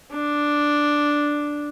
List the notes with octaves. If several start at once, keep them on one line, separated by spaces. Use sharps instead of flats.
D4